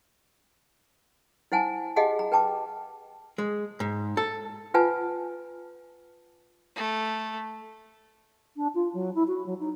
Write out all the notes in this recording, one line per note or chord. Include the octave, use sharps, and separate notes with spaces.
E4 C5 F#5 G#5 A5
G4 G#4 D#5 F5 F#5 A5
A#5
B4 G5 A5 D6
G#3
G#2
A4
F4 B4 F#5 G#5 A5
A3
D4
F4
F#3
E4
F#4
F#3
D#4